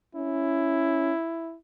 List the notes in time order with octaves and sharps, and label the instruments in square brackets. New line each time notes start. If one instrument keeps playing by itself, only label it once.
[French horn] C#4 [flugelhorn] E4